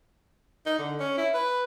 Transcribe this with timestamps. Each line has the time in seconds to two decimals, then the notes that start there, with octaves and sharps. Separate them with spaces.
0.66 D#4
0.78 D3
0.99 C#4
1.17 E4
1.34 B4